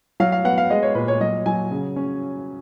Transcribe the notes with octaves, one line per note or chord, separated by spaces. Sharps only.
F#3 F5
F5
B3 F#5
F5
G#3 D#5
C#5
A#2 B4
C#5
F#3 D#5
F#3 G#5
C#3
C#4